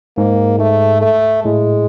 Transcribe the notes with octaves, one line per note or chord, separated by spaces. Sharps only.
G#2 A#3
G#2 A3
A3
A2 G#3